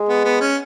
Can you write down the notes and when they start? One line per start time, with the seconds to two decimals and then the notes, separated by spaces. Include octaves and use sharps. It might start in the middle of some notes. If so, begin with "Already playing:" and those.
Already playing: G#3
0.09 B3
0.25 B3
0.41 C#4